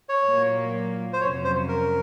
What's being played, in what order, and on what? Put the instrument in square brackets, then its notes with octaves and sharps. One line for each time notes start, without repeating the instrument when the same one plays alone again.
[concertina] C#5
[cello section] A#2 F#3 A#3
[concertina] C5
[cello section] F2 C3 F#3 C#4 [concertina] C#5
[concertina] C5
A#4